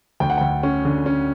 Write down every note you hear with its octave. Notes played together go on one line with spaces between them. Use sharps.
D2 G5
F#5
D2 G5
C#4
D3
C#4